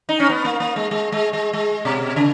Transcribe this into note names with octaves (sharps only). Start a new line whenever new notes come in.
D#4
C#4
B3
A#3
A#3
G#3
G#3
G#3
G#3
G#3
B2
C#3